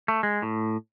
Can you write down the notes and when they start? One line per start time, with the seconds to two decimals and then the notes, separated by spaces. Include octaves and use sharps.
0.08 A3
0.23 G#3
0.42 A2